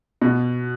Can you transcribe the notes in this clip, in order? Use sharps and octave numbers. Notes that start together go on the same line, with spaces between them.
B2